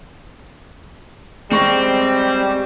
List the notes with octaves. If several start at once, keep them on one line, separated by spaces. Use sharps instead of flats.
G3 G#3 C4 C#6 A#6